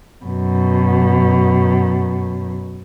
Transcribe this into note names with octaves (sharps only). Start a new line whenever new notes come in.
F#2 B2